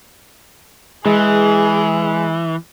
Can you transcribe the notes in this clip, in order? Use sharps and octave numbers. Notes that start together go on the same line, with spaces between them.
E3 G#3 G#4